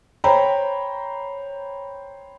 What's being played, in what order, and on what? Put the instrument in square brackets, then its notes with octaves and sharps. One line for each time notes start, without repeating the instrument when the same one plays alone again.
[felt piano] C5 C#5 G5 A#5 B5